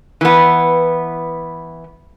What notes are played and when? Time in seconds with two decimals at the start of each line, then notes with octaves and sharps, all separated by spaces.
0.21 E3 B3